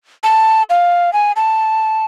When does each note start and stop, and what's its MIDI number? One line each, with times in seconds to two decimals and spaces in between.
0.24 0.63 81
0.70 1.13 77
1.13 1.32 80
1.36 2.06 81